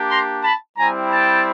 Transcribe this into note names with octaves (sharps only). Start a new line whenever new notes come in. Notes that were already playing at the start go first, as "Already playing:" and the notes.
Already playing: A#3 D4 G4
A#5 C6
A5 B5
G3 C4 E4 G#5 A#5
G5 A5